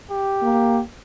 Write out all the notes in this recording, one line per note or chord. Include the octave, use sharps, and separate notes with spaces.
G4
A#3